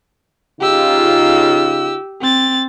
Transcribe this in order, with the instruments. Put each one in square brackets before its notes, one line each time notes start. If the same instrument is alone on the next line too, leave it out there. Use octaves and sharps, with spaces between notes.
[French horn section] C#3 D#4 F4 [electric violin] G4 E6
[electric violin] C4 A6